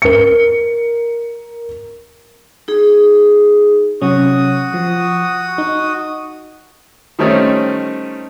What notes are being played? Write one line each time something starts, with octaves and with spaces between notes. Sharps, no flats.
A#4 C#7
D#4 G#4
C3 F#3 C#4 F#4 D#6
F3
D#4
D#3 G3 A3 C4 C#4 D#4